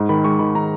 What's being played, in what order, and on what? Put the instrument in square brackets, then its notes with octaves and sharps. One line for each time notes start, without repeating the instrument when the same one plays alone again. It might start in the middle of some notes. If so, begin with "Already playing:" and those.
Already playing: [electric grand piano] G#2
D#3 B5
G#3 C#6
D#3 B5
D#3 A#5